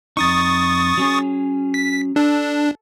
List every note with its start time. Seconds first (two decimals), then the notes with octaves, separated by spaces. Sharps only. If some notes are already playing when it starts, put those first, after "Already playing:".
0.17 F2 D#4 C#6 D#6 A6
0.97 F#3 C#4 G#4
1.74 B6
2.16 D4 A4